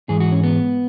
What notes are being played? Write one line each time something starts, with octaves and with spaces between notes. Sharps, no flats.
G#2 E3 G#3 G#4
F#4
C#4
B3